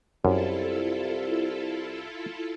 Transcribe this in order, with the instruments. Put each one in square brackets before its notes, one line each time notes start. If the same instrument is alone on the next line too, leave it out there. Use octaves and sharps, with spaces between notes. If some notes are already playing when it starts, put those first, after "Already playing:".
[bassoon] C2 [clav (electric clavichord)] F#2 [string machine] E4 F4 A4